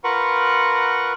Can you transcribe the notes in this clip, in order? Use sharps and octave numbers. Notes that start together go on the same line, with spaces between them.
F4 A#4 B4 F#5 C#6